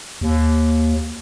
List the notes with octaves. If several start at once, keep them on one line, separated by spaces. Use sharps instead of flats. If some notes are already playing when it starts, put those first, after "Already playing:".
D#2